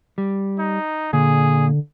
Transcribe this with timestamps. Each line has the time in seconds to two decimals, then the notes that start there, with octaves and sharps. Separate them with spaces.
0.18 G3
0.59 D#4
1.13 A#2 D3 G#4